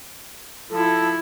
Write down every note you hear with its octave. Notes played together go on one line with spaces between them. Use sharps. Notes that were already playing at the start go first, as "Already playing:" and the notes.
F3 E4 A4